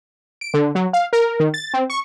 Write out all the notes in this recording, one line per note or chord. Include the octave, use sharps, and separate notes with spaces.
D7
D3
F#3
F5
A#4
D#3
A6
C4
C#6